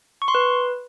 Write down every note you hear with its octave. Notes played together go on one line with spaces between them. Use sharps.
C#6
C6
B4